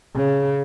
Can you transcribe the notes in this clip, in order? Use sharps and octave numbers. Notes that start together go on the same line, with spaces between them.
C#3